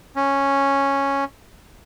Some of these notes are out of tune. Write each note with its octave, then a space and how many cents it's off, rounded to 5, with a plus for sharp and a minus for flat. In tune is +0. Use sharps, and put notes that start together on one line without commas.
C#4 -5